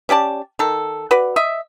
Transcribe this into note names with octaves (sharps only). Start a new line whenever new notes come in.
C#4 G4 D5 A5
D#3 A4
F#4 B4 D5
D#5 E5